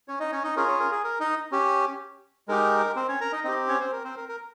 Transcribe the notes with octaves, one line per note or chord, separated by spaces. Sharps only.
C#4 C#5
D#4 D#5
C#4 C#5
D#4 D#5
C#4 F4 G#4 A#4
C#4 C#5
A#4
G#4
A#4
D#4 D#5
C#4 G4
G#3 D#4 G4 A#4
C4 C5
C#4 C#5
A#4 A#5
D#4 D#5
C4 D#4 G4 D#5
C#4 C#5
C4 C5
A#4
C4 C5
A#4
A#4